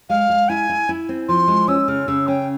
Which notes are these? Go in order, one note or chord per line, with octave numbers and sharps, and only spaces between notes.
G#3 F5
G#3
E4 G#5
E4
E4
C4
F3 C6
G#3
C#4 E6
C#3 F6
C#3 E6
C#4 G5